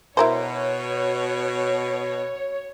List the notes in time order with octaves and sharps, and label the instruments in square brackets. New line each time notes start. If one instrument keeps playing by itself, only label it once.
[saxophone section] B2 [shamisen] E4 A#4 C5 [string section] C#5